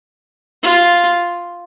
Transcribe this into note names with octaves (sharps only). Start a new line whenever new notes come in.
F4